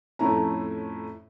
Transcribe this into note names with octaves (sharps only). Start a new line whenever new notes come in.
F2 A2 A3 C#4 E4 A#5